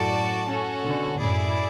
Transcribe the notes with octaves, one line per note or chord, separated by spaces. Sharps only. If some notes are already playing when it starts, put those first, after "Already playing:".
Already playing: F#2 A2 F#4 A4 D5 A5
C#4 F#4 A4
B2 D3
F#2 A2 E4 G#4 D5